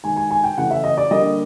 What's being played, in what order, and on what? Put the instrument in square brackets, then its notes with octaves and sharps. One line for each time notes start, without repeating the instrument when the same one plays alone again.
[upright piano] D#3 G#3 G#5
G#5
G#5
G5
C#3 E3 A3 F#5
E5
D#5
D5
D3 G3 A#3 D#5